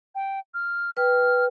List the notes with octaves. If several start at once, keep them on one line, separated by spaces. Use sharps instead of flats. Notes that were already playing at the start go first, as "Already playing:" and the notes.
G5
F6
B4 G5 F6